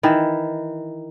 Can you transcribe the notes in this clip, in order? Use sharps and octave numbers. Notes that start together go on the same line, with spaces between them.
D#3 E3